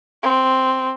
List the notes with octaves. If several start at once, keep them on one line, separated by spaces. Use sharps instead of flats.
C4